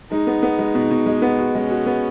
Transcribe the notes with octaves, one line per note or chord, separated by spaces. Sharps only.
G#3 D#4
B3
B3
G#3
B2
B2
G#3
B3
F#4
G#3 C#4
F#4
B3